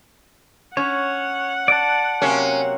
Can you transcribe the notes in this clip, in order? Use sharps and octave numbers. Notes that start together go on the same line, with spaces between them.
C#4 C#5 F#5
D5 A5
C3 F#3 A#3 C#4